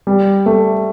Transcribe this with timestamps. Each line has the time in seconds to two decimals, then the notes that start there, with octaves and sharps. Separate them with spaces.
0.07 G3
0.46 A3